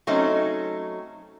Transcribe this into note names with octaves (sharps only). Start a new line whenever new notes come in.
F#3 A3 C4 C#4 D#4